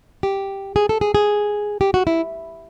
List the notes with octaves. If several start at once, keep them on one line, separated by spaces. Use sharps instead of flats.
G4
G#4
A4
G#4
G#4
G4
F#4
E4